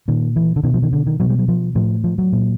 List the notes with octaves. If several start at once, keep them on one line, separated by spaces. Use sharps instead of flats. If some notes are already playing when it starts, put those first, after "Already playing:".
A#2 D#3
E3
D3
B2 D#3
F3
D#3
D3
D#3
B2 F#3
G3
F#3
F3
A2 F3
F3
F#3
A#2